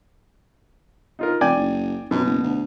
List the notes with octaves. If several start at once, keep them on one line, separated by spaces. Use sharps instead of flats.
D#4 F4 A#4
F1 D5 G5 G#5
F#1
F#2 B2
F#1
D2